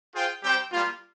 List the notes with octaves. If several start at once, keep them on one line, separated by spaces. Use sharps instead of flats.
F4 G#4 C5 G5
G3 C4 G4 C5 G5
G3 A#3 F4